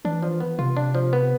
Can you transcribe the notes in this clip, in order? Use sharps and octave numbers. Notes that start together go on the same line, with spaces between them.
E3 D4
F3
B3
C3 F4
D4
F3
B3